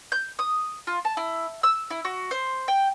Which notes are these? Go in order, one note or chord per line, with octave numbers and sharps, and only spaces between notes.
G6
D#6
F4
A5
E4
E6
E4
F#4
C5
G5